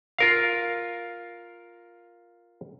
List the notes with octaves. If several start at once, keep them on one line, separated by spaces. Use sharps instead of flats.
F4 A#4 F5